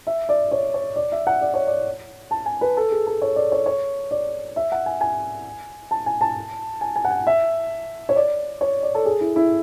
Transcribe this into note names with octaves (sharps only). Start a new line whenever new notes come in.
E5
D5
C#5
C#5
D5
E5
F#5
D5
C#5
D5
A5
G#5
B4
A4
G#4
A4
C#5
D5
C#5
C#5
D5
E5
F#5
G#5
G#5
A5
G#5
A5
G#5
G#5
F#5
G#5
E5
C#5
D5
C#5
D5
A4
G#4
E4
E4